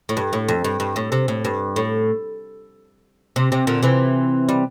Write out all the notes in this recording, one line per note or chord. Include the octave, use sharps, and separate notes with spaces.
A2
G2
A2
F2
G2
G2
A2
C3
A2
G2
A2
C3
C3
A#2 D3
C3 E3
G3